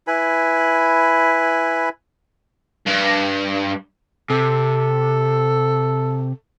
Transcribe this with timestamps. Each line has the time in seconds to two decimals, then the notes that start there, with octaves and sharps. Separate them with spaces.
0.07 E4 B4 G#5 B5
2.87 G2
4.30 C3 A4